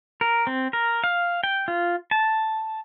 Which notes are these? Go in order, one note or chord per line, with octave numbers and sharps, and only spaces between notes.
A#4
C4
A#4
F5
G5
F4
A5